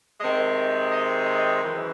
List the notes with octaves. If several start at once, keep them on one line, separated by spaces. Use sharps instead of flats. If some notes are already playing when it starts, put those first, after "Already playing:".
C3 D#3 G#3 C4 D#5
D#5
D#5
F#2 C#3 E3